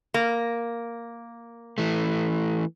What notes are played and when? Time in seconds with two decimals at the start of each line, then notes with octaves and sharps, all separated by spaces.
0.14 A#3
1.78 E3 A3